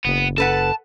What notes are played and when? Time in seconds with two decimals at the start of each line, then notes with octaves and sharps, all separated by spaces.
0.05 F#1 B3
0.38 A4 B4 F#5 A5